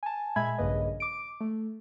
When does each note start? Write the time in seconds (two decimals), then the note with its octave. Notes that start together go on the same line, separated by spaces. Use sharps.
0.03 G#5 A5
0.36 A#2 G#3 E5 G#5 B5 G#6
0.58 A#1 G2 C#3 A#3 B4 D#5
1.00 D6 D7
1.40 A3